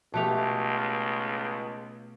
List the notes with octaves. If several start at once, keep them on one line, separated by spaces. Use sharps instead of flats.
C#2 B2 A3 G4 A5 F7